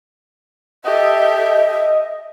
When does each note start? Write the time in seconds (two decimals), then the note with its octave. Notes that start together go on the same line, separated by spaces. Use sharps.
0.85 G4 A4 D#5 E5